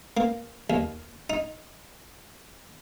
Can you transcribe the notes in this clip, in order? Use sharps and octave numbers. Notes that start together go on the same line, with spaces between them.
A#3
D#2
D#4